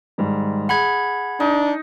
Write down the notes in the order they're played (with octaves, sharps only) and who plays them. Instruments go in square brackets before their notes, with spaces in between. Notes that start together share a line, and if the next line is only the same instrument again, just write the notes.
[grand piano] G#2 D#3 G3
[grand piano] G#4 [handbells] F#5 B5 G#6
[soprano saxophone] D4 [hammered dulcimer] D#4